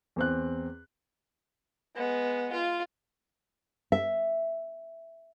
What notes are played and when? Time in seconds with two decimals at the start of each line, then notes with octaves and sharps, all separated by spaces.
0.16 E2 C4 F#6
1.95 G#3 B3
2.53 F4
3.92 E5